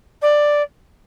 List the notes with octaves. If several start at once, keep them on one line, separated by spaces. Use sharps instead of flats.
D5